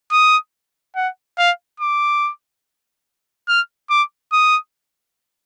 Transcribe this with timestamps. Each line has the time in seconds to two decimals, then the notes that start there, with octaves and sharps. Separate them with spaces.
0.12 D#6
0.96 F#5
1.38 F5
1.80 D6
3.48 F6
3.90 D6
4.32 D#6